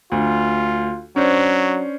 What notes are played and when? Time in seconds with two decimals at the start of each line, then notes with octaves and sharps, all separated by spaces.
0.12 D2 F4
1.16 F#3 C#4 D4 C5